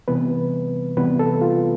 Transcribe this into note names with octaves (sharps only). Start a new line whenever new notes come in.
C3 E3 G3 B3 B4
C3 E3 G3 B3 B4
A4
F4